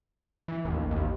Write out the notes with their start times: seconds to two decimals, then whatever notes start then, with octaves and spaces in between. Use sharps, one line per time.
0.48 E3
0.65 A1 D#2
0.91 D#2